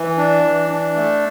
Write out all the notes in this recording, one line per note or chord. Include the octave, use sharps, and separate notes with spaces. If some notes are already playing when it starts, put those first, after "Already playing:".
Already playing: E3
D4
E3
D4
A3